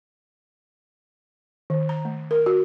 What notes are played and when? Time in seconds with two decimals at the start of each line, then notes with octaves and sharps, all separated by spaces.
1.70 D#3
1.89 A#5
2.05 A3
2.31 A#4
2.46 F#4